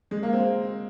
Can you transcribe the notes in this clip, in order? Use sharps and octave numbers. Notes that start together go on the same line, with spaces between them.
G#3
A#3
C4